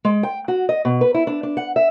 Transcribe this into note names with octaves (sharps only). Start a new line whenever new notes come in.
G#3
G5
F#4
D#5
B2
B4
E4
D4
D4
F#5
E5